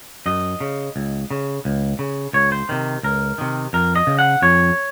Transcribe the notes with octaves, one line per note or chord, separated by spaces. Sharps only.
F#2 D#5
C#3
C#2
C#3
C#2
C#3
C#2 C#5
C5
C3 D#3
C#2 A#4
C3 D#3
F2 A#4
D#5
C#3
F#5
F2 C#5